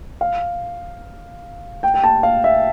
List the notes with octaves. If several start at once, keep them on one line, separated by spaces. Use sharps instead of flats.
F5
G5
G5
A5
F5
E5